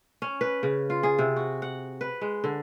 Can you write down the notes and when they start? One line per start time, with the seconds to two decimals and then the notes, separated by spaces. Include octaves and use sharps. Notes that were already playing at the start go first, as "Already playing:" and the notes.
0.22 C#4
0.41 B4
0.63 C#3
0.90 F4
1.03 G#4
1.18 C3
1.36 F#4
1.62 F#5
2.01 B4
2.21 G#3
2.44 D3